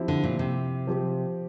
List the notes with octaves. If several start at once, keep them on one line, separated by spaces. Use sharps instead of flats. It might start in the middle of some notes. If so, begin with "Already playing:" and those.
Already playing: F3 C4 E4 G4
D3
A#2
C3
F3 C4 G4